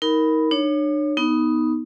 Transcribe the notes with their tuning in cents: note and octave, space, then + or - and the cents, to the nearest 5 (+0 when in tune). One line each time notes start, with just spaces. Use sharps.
D#4 +30 A#4 +0 B5 +0
D4 +40 C#5 +0
B3 -5 D#4 +5